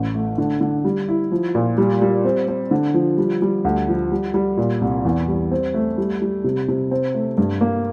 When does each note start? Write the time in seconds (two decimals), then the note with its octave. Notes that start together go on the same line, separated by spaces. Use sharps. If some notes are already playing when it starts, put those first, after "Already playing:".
Already playing: A1
0.15 A3
0.38 D3
0.61 D3
0.85 G3
1.09 E4
1.32 F3
1.55 A#2
1.78 G3
2.02 G3
2.25 C4
2.48 C4
2.71 D3
2.94 F3
3.18 G3
3.42 G3
3.65 D2
3.88 F3
4.12 G3
4.34 G3
4.57 A#2
4.81 C2
5.05 E2
5.28 G3
5.52 C4
5.74 A3
5.98 G3
6.22 G3
6.44 C3
6.68 C3
6.91 C4
7.14 A3
7.38 G2
7.61 A#3